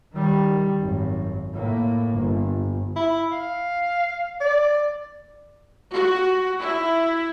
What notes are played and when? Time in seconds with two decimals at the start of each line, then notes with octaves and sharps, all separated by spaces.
0.14 D#3 G3
0.80 G#1 F#2
1.54 A2 A#3
2.16 G1
2.96 E4
3.32 F5
4.41 D5
5.93 F#4
6.60 E4